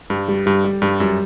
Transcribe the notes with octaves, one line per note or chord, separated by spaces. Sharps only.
G2 G3
G3
G2 G3
G3
G2 G3
F#2 G3